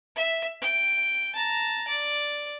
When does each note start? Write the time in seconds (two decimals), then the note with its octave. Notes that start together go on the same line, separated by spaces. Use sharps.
0.16 E5
0.62 G5
1.35 A5 A#5
1.88 D5